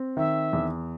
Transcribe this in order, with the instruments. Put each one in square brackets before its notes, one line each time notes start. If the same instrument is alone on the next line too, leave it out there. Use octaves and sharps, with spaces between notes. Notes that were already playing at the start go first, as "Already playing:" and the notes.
Already playing: [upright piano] C4
[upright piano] D#3 [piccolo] E5
[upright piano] E2